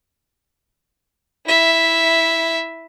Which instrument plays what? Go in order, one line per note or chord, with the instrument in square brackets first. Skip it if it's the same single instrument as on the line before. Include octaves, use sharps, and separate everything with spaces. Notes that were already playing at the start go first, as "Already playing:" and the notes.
[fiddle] E4 E5